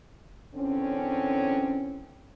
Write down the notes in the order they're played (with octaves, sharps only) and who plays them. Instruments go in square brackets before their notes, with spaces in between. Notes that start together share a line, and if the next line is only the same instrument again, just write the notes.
[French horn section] E2 D3 C4 C#4